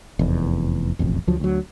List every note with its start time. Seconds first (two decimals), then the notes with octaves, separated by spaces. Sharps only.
0.19 F1 E2
0.99 E1 A1 F2
1.27 D2 F3 F#3
1.40 D2 F#3